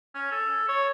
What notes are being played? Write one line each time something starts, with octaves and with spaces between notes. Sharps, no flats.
C#4
A4
C#5